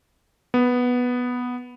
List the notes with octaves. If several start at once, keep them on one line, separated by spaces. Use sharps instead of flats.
B3